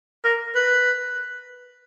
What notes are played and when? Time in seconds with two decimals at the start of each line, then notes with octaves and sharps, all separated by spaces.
0.25 A#4
0.55 B4